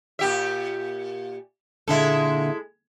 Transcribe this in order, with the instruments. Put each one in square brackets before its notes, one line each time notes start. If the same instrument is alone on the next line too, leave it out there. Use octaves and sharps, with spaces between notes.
[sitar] A#2 G4 E5
[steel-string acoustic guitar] A#2 D3 E5 [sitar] G#3 E4 A4